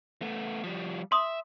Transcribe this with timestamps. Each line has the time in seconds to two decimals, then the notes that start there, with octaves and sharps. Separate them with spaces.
0.22 A3 B3
0.64 F3 G3
1.12 E5 C6 D#6